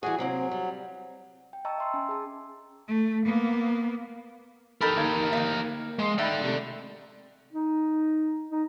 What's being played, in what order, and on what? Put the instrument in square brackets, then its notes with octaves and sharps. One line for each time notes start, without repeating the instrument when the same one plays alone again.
[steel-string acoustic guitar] E3 G3 G#5 [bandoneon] F#4 G#4
[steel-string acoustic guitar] C3 A#3 C4 [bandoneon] F#3
[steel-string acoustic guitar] G3
[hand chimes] G5
D#5 G5 A5 A#5 C#6 E6
E5 C6 E6
C#4 G#5
G#4 A5
[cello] A3
A#3 B3
[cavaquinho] D#4 A4 B5 [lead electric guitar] G4 A#4
[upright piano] D#3 A#3 G#6
[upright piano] A#3 [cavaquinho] D#4 E4
[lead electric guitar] G#3 [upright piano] C6 C7
[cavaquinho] D#4 [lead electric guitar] D5 F#5 [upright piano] E5 G5 B5
[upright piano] C3 A3
[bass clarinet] D#4
D#4